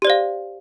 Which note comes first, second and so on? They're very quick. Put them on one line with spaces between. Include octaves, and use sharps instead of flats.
G4 D5 C5 F5